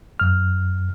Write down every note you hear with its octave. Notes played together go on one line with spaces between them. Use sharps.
F#2 F6